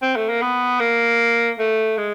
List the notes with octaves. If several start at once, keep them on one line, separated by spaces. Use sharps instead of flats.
C4
A3
A#3
B3
A#3
A3
G#3